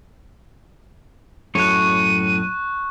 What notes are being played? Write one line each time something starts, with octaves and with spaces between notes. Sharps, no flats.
F#2 A2 C#5 C#6 F#6 D#7